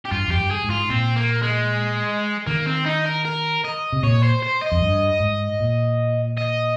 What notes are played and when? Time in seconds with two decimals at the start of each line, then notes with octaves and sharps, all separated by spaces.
0.05 G4
0.11 G2 F4
0.28 F2 G4
0.38 G2
0.51 G#4
0.64 G#2
0.70 F4
0.90 A#2 C4
1.16 A#3
1.42 G#3
2.47 D#3 A#3
2.66 C4
2.86 D#4
3.06 A#4
3.25 A#4
3.65 D#5
3.93 C3
4.03 A#2 C#5
4.23 C5
4.43 C5
4.62 D#5
4.72 F2
4.82 G2
5.20 G#2
5.60 A#2
6.38 D#5